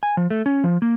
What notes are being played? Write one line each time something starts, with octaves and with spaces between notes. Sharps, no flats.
G#5
F3
A3
C#4
F3
A#3